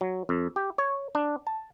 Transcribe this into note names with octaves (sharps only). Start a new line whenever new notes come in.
F#3
F2
G4
C#5
D4
A5